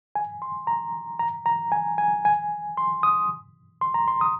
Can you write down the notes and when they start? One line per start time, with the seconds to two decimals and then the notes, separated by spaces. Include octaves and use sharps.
0.15 G#5
0.42 C6
0.67 A#5
1.19 A#5
1.46 A#5
1.72 G#5
1.98 G#5
2.25 G#5
2.77 C6
3.03 D#6
3.81 C6
3.94 A#5
4.08 C6
4.21 D#6